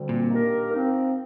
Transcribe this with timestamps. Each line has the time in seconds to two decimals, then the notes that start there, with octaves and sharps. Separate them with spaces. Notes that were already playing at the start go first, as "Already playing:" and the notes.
Already playing: D2 D3 G3 C4
0.09 A#2
0.30 D#3 A#3 D4 G4 A#4
0.71 F3 C4 D#4